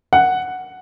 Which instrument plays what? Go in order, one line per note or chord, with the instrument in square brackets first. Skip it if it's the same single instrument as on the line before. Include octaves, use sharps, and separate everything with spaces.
[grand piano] F#5